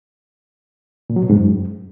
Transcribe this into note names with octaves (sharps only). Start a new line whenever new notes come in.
A#2
F#3
B2
G#2
F#2